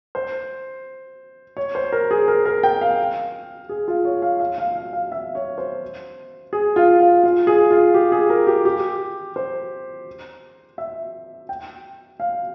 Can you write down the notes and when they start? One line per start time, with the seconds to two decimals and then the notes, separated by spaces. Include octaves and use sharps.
0.15 C5
1.57 C#5
1.75 C5
1.92 A#4
2.11 G#4
2.28 A#4
2.45 A#4
2.63 G5
2.81 F5
3.69 G#4
3.88 F4
4.05 C#5
4.22 F5
4.40 F5
4.58 F5
4.76 F5
4.93 F5
5.12 E5
5.35 C#5
5.58 C5
6.53 G#4
6.76 F4
7.00 F4
7.23 F4
7.47 G#4
7.71 F4
7.94 G4
8.12 G#4
8.30 A#4
8.47 G4
8.65 G4
9.36 C5
10.78 E5
11.49 G5
12.20 F5